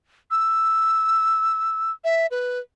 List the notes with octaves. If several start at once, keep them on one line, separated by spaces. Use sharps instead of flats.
E6
E5
B4